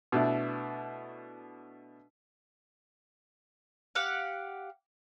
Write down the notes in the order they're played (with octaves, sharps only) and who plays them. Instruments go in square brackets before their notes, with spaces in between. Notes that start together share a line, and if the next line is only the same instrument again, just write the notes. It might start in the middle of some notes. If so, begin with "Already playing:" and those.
[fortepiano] B2 A3 D4 E4
[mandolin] G4 F5 F#5